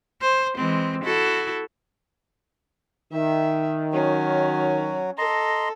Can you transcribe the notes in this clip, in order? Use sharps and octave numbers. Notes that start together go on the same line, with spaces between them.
C5
E3 G#3 C4
E4 F#4 A4
D#3 E5
F#3 C#4 F#4
A4 D#5 A#5 C6